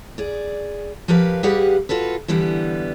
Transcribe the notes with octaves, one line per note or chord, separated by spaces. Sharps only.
G#4 D5
F3 G4 A#4 B4 F5
G3 G4 G#4 B4 F5 F#5
F4 F#4 A4 B4
D3 E3 G3 B3